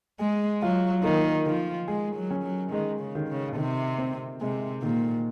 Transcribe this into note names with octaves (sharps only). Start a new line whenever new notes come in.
G#3 G#4
F#3 F4
D#3 A#3
D#3 F3
G#3 G#4
F#3
C#4
F#3
D#3 G#3
C#3
D#3
C#3
C3 D#3
C4
C3 G#3
A#2 D#3